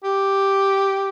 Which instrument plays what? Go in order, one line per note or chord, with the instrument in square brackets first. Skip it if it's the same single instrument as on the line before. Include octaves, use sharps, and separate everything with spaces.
[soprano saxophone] G4